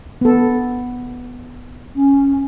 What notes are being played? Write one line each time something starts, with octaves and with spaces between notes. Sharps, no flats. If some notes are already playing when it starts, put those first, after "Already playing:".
B3 A4
C#4